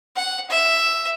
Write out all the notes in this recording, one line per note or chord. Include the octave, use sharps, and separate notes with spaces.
F#5
E5